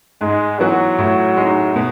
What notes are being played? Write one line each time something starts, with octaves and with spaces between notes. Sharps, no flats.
G#2 G#3
E3 F#3 B3 F#4
A2
G#3 D#4
B2